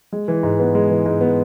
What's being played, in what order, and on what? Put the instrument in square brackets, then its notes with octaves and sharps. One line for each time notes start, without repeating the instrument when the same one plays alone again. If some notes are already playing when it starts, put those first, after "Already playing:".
[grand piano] G#3
E3
G#2
B3
G#3
E3
G#2
B3